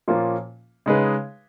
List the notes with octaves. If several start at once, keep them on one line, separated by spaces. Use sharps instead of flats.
A#2 F3 A#3 C#4 F4
C#3 G#3 D#4 G#4 B4